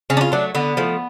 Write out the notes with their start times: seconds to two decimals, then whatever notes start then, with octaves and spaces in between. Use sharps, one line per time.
0.10 C#3 C#4
0.17 D4
0.21 F4
0.32 F#3 A3 D4
0.55 D3 B3
0.77 F3 A3